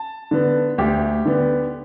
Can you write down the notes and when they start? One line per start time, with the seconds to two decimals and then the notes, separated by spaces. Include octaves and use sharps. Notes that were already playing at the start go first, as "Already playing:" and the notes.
Already playing: A5
0.31 D3 B3
0.78 D2 G4
1.25 D3 B3